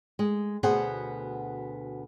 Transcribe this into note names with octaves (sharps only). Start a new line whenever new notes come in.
G#3
D2 B2 B3 G#4 C5 F#5